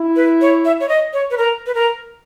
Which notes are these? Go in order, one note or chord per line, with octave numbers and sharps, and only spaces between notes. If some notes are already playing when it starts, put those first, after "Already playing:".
Already playing: E4
B4
C#5
E5
C#5
D#5
C#5
B4
A#4
B4
A#4